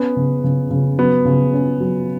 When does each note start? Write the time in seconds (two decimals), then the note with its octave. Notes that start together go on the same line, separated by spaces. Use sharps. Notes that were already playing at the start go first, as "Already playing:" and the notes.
Already playing: B3 C#4
0.16 C#3
0.44 C#3
0.70 C#3
0.98 F#3 B3
1.25 C#3
1.53 C#4
1.80 F#3